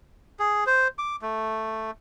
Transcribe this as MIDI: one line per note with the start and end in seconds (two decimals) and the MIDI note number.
0.39 0.64 68
0.67 0.88 72
0.99 1.16 86
1.22 1.91 57